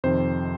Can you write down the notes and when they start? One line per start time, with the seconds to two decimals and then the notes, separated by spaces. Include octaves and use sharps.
0.04 F2 C3 D#3 C5